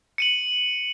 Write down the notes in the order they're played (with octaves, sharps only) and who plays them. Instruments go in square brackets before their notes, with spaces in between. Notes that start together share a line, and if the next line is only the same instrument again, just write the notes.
[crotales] C#7 D#7 F#7